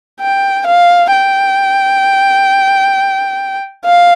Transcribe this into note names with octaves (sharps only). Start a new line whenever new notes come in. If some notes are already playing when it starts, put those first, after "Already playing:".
G5
F5
G5
F5